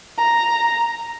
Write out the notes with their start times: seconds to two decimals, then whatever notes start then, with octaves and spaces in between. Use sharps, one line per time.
0.18 A#5